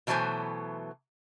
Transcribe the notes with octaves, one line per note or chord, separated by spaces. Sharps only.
B2 E3 F#3 A3 C5 G#5